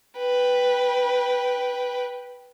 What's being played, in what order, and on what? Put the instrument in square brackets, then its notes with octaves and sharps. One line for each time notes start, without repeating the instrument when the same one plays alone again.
[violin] B4 G5